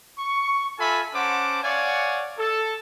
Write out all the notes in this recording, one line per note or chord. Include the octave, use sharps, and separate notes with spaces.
C#6
F4 A4 E5 G#5 B5
C#4 C5 F#5 A5 D6
C#5 D5 F5 F#5 G#5
A4